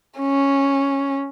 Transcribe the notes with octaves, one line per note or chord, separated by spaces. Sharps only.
C#4